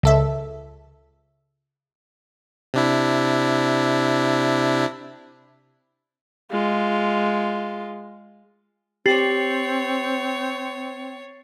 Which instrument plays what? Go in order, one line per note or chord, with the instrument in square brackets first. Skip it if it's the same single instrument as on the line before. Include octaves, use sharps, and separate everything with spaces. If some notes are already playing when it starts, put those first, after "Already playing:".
[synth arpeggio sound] C#2 A4 E5
[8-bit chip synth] C3 D4 E4
[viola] G#3 F4
[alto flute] C4 [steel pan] G4 [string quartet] C#5 [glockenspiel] A6 C7 F#7